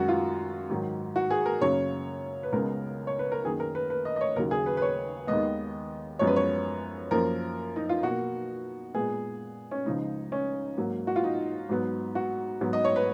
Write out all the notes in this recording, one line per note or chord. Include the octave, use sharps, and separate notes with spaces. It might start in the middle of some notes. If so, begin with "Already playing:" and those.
Already playing: F#2 D#3 G#3 F#4
F4
G#2 D#3 F#3
F#4
G#4
A#4
F#2 C#3 F#3 A#3 C#5
B4
C#2 C#3 G#3 B3 A#4
C#5
B4
A#4
F#2 D#3 A#3 G#4
A#4
B4
B4
D#5
D#5
C#5
D#2 C#3 F#3 A#4
G#4
B4
B4
C#5
D#2 D#3 G#3 B3 D#5
F#2 F3 G#3 B3 C#5
B4
C#5
F#2 F3 A#3 A#4
D#4
F4
B2 A#3 F#4
A#2 G#3 B3 G#4
C#4
C#2 C#3 F3 G#3 D#4
C#4
G#2 F#3 A#3
F#4
F4
D#4
G#2 F#3 B3
F#4
G#2 F#3 B3
D#5
C#5
B4